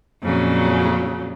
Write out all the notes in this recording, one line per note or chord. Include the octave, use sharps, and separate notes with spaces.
F2 A#2 C#3 F#3 C#4